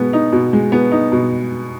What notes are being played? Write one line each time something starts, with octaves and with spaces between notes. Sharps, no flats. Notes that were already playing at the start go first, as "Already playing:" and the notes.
Already playing: B2 G#3 B3
D#4
B2
G#3
B3
D#4
B2